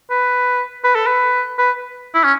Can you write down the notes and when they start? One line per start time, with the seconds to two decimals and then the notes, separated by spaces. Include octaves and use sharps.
0.10 B4
0.84 B4
0.95 A4
1.06 B4
1.58 B4
2.14 E4
2.24 C#4